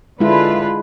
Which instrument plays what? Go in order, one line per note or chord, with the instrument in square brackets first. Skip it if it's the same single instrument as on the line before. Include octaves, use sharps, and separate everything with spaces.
[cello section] D3 F4 B4 [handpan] G#3 E4